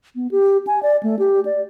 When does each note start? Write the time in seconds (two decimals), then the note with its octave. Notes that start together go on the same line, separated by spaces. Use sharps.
0.15 B3
0.31 G4
0.67 G#5
0.83 D5
1.03 A3
1.19 G4
1.45 D5